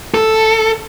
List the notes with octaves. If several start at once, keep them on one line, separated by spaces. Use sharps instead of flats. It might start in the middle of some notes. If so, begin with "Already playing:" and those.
A4